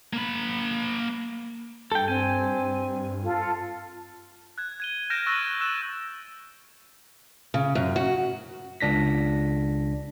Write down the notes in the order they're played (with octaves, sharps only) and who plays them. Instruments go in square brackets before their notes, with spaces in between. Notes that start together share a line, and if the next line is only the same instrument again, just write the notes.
[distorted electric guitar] A#3 B5
[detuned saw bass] G2 [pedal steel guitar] A4 G5
[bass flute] C4 [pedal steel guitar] G#5
[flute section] F4 A4
[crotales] F#6 G#6
G#6 D#7 G7
F6 G6 G#6 A#6 D7 E7
C#6 E6 F#6 A6 A#6 D#7
E6 F#6 A#6 E7
[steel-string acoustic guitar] C#3
F#2
F#4
[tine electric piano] C#2 D4 A#6 B6